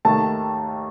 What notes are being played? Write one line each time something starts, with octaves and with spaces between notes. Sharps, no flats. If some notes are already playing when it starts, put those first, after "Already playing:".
D#2 D#3 A3 A5